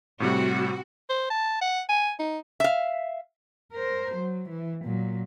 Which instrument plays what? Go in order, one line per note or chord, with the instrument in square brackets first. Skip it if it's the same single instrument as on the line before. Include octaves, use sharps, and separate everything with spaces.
[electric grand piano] A2 C3 G3 [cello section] C4 F#4
[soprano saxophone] C5
A5
F#5
G#5
D#4
[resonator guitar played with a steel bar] E5 F5
[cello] A#4 C5
F#3
E3
A#2 F#3